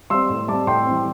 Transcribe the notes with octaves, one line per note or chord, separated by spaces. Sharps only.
G3 C4 C6 E6
A2
G3 C4 A5 D6
A2 G5 C6
E3 G3 C4